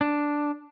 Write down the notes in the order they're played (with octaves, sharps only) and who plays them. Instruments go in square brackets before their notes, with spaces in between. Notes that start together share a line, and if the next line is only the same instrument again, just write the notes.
[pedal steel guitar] D4